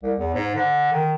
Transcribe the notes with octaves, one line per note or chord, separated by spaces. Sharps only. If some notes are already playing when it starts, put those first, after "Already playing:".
C2
E2
G#2
D3
D#3